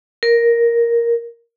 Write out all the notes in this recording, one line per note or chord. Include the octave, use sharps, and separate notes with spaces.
A#4